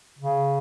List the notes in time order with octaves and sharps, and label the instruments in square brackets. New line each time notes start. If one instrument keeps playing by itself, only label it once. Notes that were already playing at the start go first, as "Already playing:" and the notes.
[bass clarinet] C#3